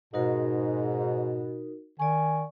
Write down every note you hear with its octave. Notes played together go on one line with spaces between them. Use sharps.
G#2 B2 D#4 F#4 A#4
D#3 D5 G#5 C#6